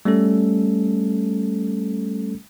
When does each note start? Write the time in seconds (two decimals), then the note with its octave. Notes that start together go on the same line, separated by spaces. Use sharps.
0.05 G3 A3 C#4 A4